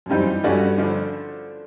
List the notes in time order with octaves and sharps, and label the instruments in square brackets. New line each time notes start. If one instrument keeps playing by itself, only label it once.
[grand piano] F#2
[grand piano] G2 [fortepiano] E3 G3 C4 D#4
[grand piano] F#2
[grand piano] G2 [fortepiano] A3 C#4 F#4 B4 D5
[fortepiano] D3 F3 A3 D4